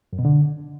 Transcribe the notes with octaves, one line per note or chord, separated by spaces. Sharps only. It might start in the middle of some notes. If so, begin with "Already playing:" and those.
F#2
B2
D3